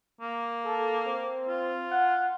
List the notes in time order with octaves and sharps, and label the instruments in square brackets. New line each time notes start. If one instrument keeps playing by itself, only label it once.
[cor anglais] A#3
[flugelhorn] A4
C4
[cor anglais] F4
[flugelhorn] F#5